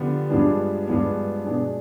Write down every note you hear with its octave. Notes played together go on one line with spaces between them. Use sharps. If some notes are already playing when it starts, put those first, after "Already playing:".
Already playing: D3 F3 B3 G4
G2 F3 G#3 B3 D4
G2 F3 G#3 B3 D4
B2 G#3 D4